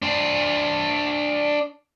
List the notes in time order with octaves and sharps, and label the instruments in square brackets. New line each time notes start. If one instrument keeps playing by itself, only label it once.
[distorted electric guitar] D4 C5